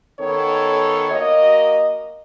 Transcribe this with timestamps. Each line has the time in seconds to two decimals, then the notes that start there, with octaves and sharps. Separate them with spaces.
0.20 D#3 B3 C#4 A4 C#5
1.11 A#3 F#4 A#4 D#5